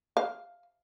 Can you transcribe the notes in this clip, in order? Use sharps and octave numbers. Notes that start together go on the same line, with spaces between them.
F5